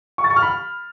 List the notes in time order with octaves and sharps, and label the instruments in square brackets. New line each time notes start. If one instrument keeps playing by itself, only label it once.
[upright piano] C#6
A6
C#6
F6
B5